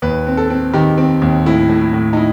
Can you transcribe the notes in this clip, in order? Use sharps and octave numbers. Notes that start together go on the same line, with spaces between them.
D#2 B4
C4
A4
C4
D#3 G4
C4
D#2
A2 E4
A2
E4
A2
D#4
E4